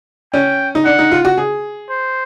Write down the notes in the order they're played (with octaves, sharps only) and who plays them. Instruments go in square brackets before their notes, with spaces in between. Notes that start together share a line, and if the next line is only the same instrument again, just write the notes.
[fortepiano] C#4 [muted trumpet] G5
[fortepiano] D#4
[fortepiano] D4 [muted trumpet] F#5
[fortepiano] D#4
F4
F#4
G#4
[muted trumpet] C5